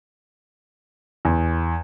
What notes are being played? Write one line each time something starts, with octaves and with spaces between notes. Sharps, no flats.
E2